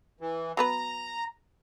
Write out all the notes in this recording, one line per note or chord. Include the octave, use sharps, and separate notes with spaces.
E3
F#3 B3 B4 A#5